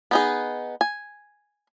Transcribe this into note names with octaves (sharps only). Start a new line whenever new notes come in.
B3 D#4 G#4
G#5